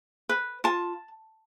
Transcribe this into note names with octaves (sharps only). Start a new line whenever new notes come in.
B4
F4 A5